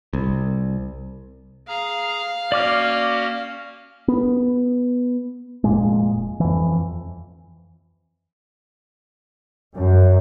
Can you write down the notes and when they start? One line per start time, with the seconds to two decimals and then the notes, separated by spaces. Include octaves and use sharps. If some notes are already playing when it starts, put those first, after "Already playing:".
0.13 C2
1.68 G#4 F5 A#5
2.52 A#3 C#4 F#4 D5 D6 F6
4.08 B3
5.64 F1 A#2 G#3
6.40 F2 E3
9.77 F#2